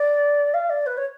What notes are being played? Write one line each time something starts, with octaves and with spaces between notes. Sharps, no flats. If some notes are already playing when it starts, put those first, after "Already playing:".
Already playing: D5
F5
D5
B4
C#5